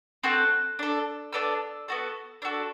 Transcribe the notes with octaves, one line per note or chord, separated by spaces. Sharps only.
C4 F#4 A4 F#6
D4 A4
B3 D4 A4 E6
B3 F#4 A4
D4 F#4 A4 E6